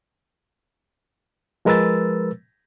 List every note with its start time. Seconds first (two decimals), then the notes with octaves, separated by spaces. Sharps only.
1.65 F3 G#3 A#4 B4 E6 A6